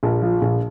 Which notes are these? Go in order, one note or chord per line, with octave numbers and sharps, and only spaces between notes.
A#1
F3
A#1